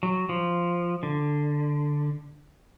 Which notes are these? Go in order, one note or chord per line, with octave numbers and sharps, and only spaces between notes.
F#3
F3
D3